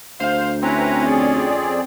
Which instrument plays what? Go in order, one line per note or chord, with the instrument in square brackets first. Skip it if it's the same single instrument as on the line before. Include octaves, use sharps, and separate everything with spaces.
[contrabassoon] D2 [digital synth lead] C5 [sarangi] F5
[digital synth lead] C4 [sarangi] C#4 [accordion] E4 B4 A#5
[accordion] F2 G#4 D5